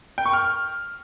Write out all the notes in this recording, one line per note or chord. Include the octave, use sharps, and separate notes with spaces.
G5
C#6
F6